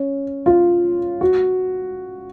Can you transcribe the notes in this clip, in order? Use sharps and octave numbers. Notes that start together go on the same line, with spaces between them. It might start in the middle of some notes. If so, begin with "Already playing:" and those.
Already playing: C#4
F4
F#4